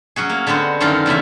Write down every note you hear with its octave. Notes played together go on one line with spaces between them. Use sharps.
F#3 C#4 F#4 G#4
A#3
D3 G#3 B3 C4 F#4
F#2 D3 D#3 C#4 D#4 F4
E2 C#3 A#3 E5